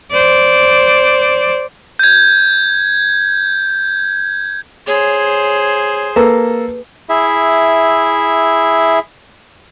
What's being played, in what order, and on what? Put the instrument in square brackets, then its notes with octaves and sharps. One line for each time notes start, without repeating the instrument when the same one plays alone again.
[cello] C5 D5
[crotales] G6 G#6
[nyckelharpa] G#4 C5 [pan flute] C#5
[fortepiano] A#3 A4 [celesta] B4
[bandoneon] E4 G#4 E5